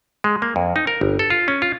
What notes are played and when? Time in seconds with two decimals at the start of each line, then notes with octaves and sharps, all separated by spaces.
0.24 G#3
0.42 A#3
0.56 F2
0.76 D#4
0.87 A#4
1.01 G1
1.19 A4
1.30 F4
1.48 C#4
1.62 F4